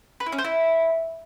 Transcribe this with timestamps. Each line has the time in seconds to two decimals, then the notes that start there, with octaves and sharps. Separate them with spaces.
0.20 B4
0.26 E4
0.32 C#4
0.38 C5
0.44 E4